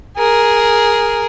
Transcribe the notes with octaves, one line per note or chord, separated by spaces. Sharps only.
G#4 A#4